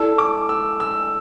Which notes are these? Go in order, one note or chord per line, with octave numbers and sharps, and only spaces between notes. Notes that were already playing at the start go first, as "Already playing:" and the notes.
Already playing: E4 A4 D5 A5 E6
D6
E6
E6